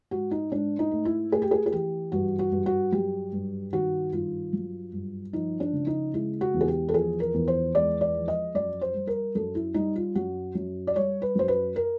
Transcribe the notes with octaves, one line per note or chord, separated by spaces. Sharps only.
G#2 F#4
D#4
G#2 D4
D#4
A3
E4
A3 G#4
G4
G#4
G#4
E3 G4
G2 F#4
F#4
G2
F#4
F#3 G4
G2
D#3 F#4
G2 F4
F#3
G2
F3 D#4
D4
C#3
D#4
G#3 E4
F#4
E2
G#4
G4
A4
F3 G#4
A#4
E2
C5
G#3 D5
D5
F3
D#5
F#2 D5
C5
G3
A#4
F#2 A4
E4
G3 D#4
F4
F#2 F#4
F#2
D5
G3 C#5
B4
F#2 C5
B4
A#4